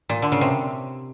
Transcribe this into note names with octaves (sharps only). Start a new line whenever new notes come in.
A#2
D3
C#3
C3